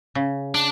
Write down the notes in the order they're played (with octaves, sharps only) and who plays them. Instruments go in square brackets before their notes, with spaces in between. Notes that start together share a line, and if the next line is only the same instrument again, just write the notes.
[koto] C#3
[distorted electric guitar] D4